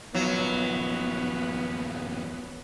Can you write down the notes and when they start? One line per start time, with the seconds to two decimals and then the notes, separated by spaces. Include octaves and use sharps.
0.15 D#2 F3 F#3 B3